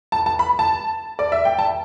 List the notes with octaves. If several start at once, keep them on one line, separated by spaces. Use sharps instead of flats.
A5
A5
B5
A5
D5
E5
G5
A5